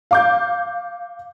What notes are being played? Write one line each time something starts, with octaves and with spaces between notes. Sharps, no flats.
F5 D6 G6